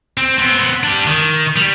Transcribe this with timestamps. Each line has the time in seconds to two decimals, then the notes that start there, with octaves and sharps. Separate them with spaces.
0.17 C4
0.38 B3 C4
0.83 D4 G4
1.07 D#3
1.56 G3